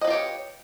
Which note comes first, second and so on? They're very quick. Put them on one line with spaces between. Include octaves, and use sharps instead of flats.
D#5 B4 F4 G4 C#5